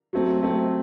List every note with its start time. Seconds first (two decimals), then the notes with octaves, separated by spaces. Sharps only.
0.13 F#3 A3 C4
0.42 F#3 A3 C4